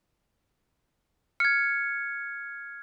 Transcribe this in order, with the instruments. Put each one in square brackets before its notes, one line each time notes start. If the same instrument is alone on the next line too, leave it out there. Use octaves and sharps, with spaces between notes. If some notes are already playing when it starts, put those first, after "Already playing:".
[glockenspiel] F6 G#6 [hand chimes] C#7